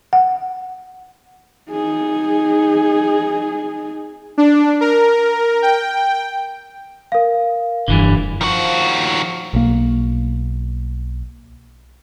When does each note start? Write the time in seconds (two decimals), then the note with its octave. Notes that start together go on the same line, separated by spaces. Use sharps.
0.13 F#5
1.70 D#4 G#4
4.38 D4
4.81 A#4
5.62 G5
7.12 A#4 F5
7.88 F1 G2 D3 E3 G3
8.41 D#3 F3 F#4
9.54 B1 A#3